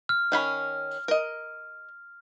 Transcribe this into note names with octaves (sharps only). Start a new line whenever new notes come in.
F6
D#3 C#4 B5
A#4 D#5